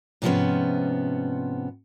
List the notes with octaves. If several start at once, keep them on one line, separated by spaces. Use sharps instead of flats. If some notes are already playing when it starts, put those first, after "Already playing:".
G#2 C3 F3 G3 B3 C#4